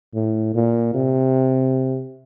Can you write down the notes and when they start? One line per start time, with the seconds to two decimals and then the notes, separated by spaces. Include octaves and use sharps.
0.14 A2
0.54 A#2
0.94 C3